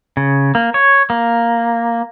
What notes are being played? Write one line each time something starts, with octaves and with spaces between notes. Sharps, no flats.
C#3
A#3
C#5
A#3